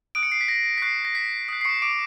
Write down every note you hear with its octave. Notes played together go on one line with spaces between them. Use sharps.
D#6 F#6 D7
C#7
C7
B6
A#6
B6
C#6 F#6 C7
A#6
B6
D#6 F#6 C7
C7
C#6 C#7
D6 D7